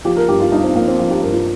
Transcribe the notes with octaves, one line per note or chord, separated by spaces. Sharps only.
F3 G4
A#4
G2 G4
F4
G2 D#4
C4
F3 A#3
C4
F3 F4
G4
G2 A#4
F4